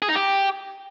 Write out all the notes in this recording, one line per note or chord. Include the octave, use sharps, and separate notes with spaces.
G#4
D#4
G4